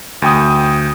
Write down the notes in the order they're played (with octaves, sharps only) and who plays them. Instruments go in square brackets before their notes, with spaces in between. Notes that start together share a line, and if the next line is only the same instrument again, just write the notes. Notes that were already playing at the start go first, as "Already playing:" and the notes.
[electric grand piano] D2 G5 D#6